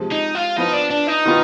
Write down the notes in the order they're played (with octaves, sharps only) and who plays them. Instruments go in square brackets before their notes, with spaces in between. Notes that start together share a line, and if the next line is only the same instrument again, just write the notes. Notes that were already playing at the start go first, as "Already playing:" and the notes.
Already playing: [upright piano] C3 F3 G#3
[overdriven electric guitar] D#4
F4
[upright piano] F3 B3 F4 [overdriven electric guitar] D#4
[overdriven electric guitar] D4
D4
D#4
[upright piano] D#3 B3 F4